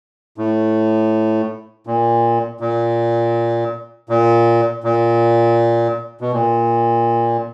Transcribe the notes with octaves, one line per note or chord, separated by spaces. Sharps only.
A2
A#2
A#2
A#2
A#2
B2
A#2